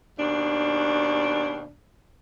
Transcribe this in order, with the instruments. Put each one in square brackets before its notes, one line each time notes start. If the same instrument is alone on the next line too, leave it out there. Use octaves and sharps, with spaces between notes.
[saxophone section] D#2 B2 D4